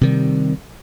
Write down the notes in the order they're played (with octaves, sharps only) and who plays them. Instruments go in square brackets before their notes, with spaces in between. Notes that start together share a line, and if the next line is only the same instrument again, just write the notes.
[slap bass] C3 D#3 G3